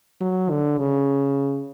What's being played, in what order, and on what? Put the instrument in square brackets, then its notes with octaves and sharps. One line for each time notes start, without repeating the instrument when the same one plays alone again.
[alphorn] F#3
D3
C#3